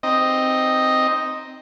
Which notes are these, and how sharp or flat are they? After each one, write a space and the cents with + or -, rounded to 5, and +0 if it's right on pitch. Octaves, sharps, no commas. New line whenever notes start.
C4 +0 D#4 +0 D#5 +0